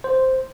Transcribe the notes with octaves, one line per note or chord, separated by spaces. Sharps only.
C5